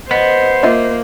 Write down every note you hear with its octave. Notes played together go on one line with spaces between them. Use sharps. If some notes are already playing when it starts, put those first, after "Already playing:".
B3 C5 D#5
A#3 F4 D#5 E5